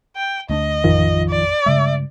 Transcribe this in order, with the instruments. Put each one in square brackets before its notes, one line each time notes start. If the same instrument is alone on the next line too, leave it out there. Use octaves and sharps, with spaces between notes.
[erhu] G5
[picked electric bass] D2 A3 D4 [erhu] D#5
[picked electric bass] A1 F2 [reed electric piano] D#3 F3 F4
[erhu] D5
[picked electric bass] G2 C#3 G#3 [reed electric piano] E5